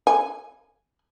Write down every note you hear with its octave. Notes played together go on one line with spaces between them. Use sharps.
G#5